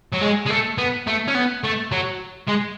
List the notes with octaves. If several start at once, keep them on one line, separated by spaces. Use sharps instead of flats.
F#3
G#3
G#3
A3
B3
A3
C#4
B3
A3
F#3
G#3